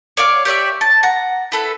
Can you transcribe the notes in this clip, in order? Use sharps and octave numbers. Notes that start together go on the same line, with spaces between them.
C#5 D5 F5 D6
G4 C#5 D5 E5
A5
F#5 A#5
E4 A4 B4